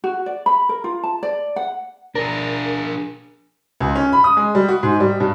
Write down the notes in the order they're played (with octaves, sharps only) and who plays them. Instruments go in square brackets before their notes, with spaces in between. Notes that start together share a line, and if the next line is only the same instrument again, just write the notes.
[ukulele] F#4
D5
B5
A#4
F4
A5
D5
F#5
[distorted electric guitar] D4 G#4 [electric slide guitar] A#4
[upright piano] C#2
C#4
B5
D#6
G#3
G3
F#4
G#2
G3
G2